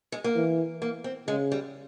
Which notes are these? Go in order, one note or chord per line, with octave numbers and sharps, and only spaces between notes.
G#3
A#3
E3
A#3
C4
C#3 G#3
G3